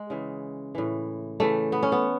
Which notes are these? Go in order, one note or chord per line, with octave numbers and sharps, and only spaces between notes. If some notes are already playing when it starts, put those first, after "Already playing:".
Already playing: G#3
C#3 E3
A2 E3
C#3 E3 A3
B3
C#4
B3